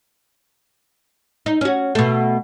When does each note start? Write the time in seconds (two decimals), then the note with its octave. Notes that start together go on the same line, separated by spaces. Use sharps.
1.46 D#4
1.61 C#4 F#4
1.95 B2 A3